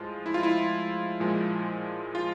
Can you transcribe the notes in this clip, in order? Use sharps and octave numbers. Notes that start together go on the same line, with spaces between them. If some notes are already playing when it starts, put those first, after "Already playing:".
Already playing: A2 F3 G#3 F4
E4
F4
E4
A#2 F3 G#3
F4